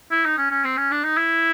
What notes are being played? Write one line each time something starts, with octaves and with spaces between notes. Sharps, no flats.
E4
D#4
C#4
C#4
C4
C#4
D4
D#4
E4